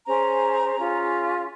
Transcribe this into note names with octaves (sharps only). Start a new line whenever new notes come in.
C#4 G#4 C5 A#5
C#4 F4 G#4